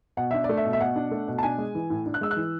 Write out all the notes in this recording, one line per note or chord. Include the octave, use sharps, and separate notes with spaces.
B2 F#5
D4 E5
D5
A3
E5
B2
E5
B2 F#5
D4
A3
B2
A5
D4 G#5
G#3
E3
A2
D4
F#6
G#3 E6
F#6
E3